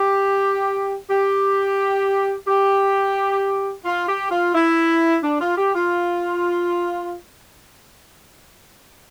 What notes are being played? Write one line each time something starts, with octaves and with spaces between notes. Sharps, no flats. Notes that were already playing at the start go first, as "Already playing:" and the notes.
Already playing: G4
G4
G4
F4
G4
F4
E4
D4
F4
G4
F4